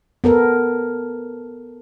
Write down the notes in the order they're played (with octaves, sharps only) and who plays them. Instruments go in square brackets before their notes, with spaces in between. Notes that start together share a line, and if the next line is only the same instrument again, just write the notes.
[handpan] B3 A4 A#4